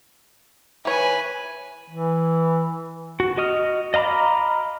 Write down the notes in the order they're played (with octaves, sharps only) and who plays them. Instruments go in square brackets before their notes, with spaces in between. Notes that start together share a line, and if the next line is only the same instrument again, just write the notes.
[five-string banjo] E3 C#5 [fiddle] B4 G#5
[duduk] E3
[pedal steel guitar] F#4
F#4 D#5 D#6 F6
D#5 F5 A#5 B5 D6